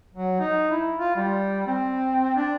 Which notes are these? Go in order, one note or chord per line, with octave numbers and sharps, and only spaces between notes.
F#3
D#4
E4
F4
G3
C4
D4